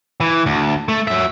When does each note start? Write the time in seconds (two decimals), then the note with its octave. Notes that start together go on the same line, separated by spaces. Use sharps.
0.20 E3
0.46 D2
0.88 A3
1.07 F#3 E5